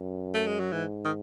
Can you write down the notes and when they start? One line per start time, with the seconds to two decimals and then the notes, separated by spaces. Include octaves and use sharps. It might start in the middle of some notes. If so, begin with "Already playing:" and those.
Already playing: F#2
0.34 A3
0.47 G#3
0.59 F#3
0.72 G#2 E3
1.05 D#3